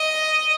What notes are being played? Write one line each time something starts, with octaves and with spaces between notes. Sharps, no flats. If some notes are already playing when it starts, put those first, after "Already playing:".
Already playing: D#5